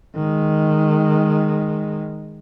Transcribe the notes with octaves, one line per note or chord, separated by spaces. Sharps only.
D#3 G#3